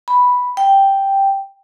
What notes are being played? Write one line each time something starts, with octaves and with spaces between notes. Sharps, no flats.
B5
G5